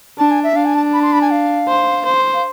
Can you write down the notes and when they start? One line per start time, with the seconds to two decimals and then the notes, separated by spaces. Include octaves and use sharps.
0.19 D4 A5
0.31 G#5
0.44 E5
0.55 D4 F5
0.65 G#5
0.74 A5
0.93 B5
1.02 C6
1.12 B5
1.22 G#5
1.31 F5
1.68 C5
2.06 C5
2.34 F5